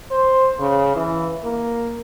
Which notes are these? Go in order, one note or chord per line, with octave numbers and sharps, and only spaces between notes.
C5
C#3
E3
A#3